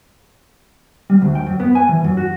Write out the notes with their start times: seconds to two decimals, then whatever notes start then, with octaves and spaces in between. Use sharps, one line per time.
1.10 G3
1.22 D2
1.35 G5
1.47 F#2
1.60 B3
1.75 G#5
1.89 E3
2.04 F#2
2.17 F#4